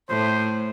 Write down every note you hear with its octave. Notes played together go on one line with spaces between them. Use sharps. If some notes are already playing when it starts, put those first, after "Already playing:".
A2 C5